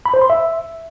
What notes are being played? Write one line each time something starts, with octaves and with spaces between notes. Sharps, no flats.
B5
C5
C6
E5